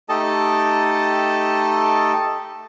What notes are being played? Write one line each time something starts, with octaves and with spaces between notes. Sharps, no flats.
A3 D#4 G4 A4 D#5 A5